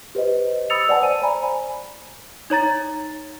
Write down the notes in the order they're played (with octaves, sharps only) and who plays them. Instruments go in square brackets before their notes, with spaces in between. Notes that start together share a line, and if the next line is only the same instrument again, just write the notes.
[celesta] G4 B4 C5 D#5
B5 D#6 E6 A6 C#7 F7
B4 D5 F#5 G#5 A5
C5 G#5 D#7
C5 D5 G#5 A#5 B5
D#4 C#5 A#5 A6